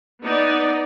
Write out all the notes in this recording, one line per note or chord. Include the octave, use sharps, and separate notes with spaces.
B3 D#4 D5